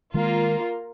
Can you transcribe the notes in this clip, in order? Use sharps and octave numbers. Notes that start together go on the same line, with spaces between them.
D#3 G#3 A#3 F4 A#4